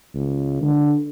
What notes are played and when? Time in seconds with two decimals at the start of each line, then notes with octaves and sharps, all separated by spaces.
0.15 C#2
0.62 D3